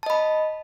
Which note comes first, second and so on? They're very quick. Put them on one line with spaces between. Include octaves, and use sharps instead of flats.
A5 D#5 B5